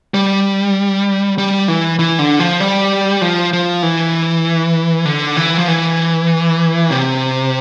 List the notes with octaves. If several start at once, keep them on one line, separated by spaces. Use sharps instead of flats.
G3
G3
E3
E3
D3
F3
G3
F3
F3
E3
D3
E3
F3
E3
C3